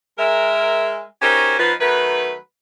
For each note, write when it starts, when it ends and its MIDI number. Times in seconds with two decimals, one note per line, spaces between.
0.19 1.04 56
0.19 1.04 70
0.19 1.04 76
1.22 1.56 61
1.22 1.56 63
1.22 1.56 66
1.22 1.56 67
1.22 1.56 70
1.22 1.56 72
1.59 1.73 53
1.59 1.73 59
1.59 1.73 63
1.59 1.73 71
1.81 2.36 51
1.81 2.36 54
1.81 2.36 57
1.81 2.36 71